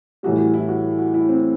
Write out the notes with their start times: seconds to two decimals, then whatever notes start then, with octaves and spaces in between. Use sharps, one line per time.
0.23 A2 E3 G3 F#4
0.38 F#4
0.54 E4
0.69 F#4
0.99 F#4
1.14 E4
1.29 C4